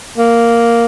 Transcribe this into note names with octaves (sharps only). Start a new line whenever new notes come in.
A#3